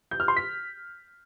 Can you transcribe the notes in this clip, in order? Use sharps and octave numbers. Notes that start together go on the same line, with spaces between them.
G6
F6
C6
B6